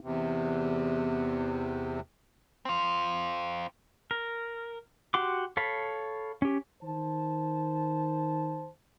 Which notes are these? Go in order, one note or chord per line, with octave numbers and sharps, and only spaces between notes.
E2 C3
C4 F4
A#4
F#4 G4 F#5 C6 D6
A4 C#5 F5 B5
C#4 G4
D#3 C5 A5